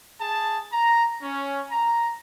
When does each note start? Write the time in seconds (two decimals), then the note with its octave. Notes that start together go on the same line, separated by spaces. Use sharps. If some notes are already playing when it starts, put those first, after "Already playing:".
0.20 G#4 A5
0.71 A#5
1.21 C#4
1.70 A#5